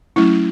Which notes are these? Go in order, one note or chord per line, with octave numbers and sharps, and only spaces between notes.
F#3 A3 C#4 E4